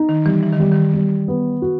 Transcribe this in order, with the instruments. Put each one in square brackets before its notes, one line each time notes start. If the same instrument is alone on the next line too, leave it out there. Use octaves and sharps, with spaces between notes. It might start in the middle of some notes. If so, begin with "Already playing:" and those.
Already playing: [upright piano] D#4
[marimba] D#3
[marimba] E3 [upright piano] G3
[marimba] E3
D#3
[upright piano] G3
[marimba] D#3
[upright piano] G3
B3
F#4